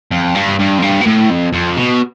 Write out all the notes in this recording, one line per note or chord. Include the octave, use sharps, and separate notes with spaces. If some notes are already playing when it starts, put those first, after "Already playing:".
F2
G2
G2
F2
G2
B2
A2
F2
F2
B2